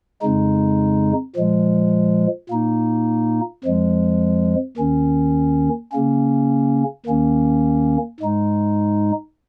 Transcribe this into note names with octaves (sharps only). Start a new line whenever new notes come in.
F2 C#3 G#3 D#4
A#2 F3 G#3
A#2 A#3 D#4
F2 F3 G#3
D#2 D#3 C#4
C#3 A#3 C#4
D#2 D#3 A#3 C#4
G#2 G#3 D#4